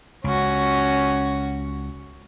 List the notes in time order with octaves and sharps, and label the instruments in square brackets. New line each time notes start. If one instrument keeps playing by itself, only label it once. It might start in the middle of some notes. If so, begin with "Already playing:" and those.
[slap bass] C#2 [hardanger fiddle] C#4 F#4